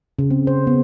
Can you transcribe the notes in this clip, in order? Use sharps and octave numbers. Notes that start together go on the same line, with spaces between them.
C#3
C4
C5
B3